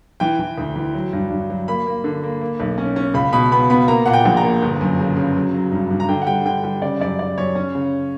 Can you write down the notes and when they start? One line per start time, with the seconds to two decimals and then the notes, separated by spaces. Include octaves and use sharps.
0.20 E3 G5
0.39 E3
0.58 D2
0.76 E3
0.95 F#3
1.13 G2
1.30 G2
1.50 F#3
1.68 A#3 B5
1.87 A#3
2.04 D3
2.23 A#3
2.41 A#3
2.60 B1
2.78 C#4
2.96 C#4
3.14 C#2 B5
3.33 B2 B5
3.52 B3 B5
3.70 B3 B5
3.88 A#3 A#5
4.06 A#2 F#5
4.13 G5
4.25 A#1
4.37 A#5
4.44 A#3
4.62 G1
4.81 F#2
4.99 C#3
5.17 C#3
5.36 F#3
5.54 F#3
5.72 G2
5.90 G2
6.00 A#5
6.09 D3 G5
6.22 F#5
6.27 G3 G5
6.45 D3 G5
6.64 G3 G5
6.82 C#3 D5
7.00 F#2 D5
7.19 F#2 D5
7.38 F#2 C#5
7.55 C#4
7.75 C#3